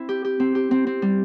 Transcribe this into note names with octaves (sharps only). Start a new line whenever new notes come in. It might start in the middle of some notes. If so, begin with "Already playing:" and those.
Already playing: C4 E4
G4
G4
C4
G4
C4
C4
G3